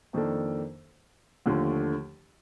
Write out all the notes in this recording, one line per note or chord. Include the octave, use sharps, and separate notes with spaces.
F2 D#3 A#3 D4 A4
D#2 D3 F3 A3